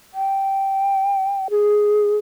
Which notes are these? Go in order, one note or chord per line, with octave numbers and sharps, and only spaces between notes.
G5
G#4